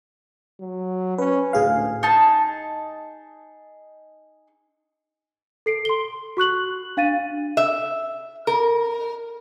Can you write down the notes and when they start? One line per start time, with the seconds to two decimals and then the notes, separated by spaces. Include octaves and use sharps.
0.60 F#3
1.18 C#4 B4
1.53 D2 A2 G#4 F5
2.03 D#4 G#4 A5
5.66 A4 C7 D7
5.85 C6 G7
6.37 F#4 C#6 F#6 F#7
6.97 D4 F5 A6 D#7
7.57 E5
8.47 A#4